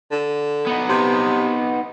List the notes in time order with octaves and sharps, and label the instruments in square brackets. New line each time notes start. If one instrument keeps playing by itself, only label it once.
[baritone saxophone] D3
[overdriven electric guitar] B3 D#4
[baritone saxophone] C3